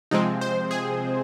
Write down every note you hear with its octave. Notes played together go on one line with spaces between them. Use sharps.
C3 F3 G#3 C4 D#4
C5
G#4